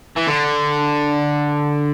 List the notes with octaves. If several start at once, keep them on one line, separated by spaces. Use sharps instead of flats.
E3
D3